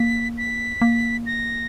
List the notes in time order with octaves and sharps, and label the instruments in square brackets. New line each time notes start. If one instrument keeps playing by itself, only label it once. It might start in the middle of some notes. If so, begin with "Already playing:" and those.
Already playing: [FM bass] A#3 [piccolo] B6
[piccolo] B6
[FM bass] A#3
[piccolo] A#6